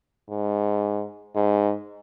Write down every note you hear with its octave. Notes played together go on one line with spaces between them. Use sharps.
G#2
G#2